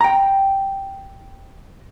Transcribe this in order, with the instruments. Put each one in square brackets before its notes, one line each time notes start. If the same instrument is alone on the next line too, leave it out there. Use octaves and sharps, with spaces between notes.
[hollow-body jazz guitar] G5 A#5